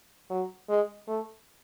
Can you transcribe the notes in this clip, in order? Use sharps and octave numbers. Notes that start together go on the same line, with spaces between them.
F#3
G#3
A3